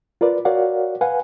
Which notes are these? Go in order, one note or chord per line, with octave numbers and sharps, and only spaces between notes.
F4 A#4 B4 D5
F#4 A#4 C#5 D5 F5 F#5
B4 F5 F#5 G#5